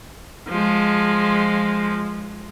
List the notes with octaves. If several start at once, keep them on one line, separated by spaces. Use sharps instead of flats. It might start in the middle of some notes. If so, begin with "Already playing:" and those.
F3 G#3